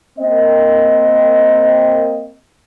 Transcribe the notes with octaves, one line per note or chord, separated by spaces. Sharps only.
A#3 C4 D#5